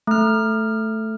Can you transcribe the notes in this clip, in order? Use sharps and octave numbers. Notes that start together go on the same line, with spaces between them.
A3 F6